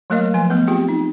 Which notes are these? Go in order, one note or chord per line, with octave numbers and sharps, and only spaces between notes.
F#3 A3 A#3 A#4 D#5 F5
F3 G#5
A3 B3 B4
C4 F4 G4 G#4 G5
D#4